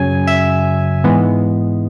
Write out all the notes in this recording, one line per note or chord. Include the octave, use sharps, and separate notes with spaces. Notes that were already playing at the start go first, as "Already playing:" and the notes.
Already playing: F#2 C#3 F#3 G#5
E5
G#2 E3 G#3 B3